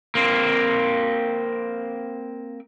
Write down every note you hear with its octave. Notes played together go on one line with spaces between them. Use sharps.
A#3 C4